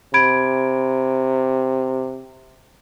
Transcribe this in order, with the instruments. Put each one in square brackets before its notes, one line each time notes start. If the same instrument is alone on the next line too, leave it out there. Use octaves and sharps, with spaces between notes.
[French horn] C3 [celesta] B5 G#6 D7